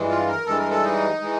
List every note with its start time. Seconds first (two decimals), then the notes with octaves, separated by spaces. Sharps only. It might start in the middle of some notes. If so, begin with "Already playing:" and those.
Already playing: G2 E3 G#3
0.09 F4
0.28 A#4
0.46 G2 E3 G#3 A4
0.58 A#4
0.70 A4
0.84 D#4
1.21 E3 G#3